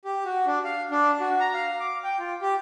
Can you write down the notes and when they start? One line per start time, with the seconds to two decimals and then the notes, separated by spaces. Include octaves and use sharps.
0.05 G4
0.25 F#4
0.47 D4
0.65 F5
0.91 D4
1.21 F#4
1.40 A#5
1.54 F5
1.80 D6
2.04 G5
2.19 F4
2.42 G4